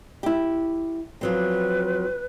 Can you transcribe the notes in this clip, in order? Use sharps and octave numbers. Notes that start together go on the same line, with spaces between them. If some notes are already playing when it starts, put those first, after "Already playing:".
E4 G4
F3 F#3 C4 B4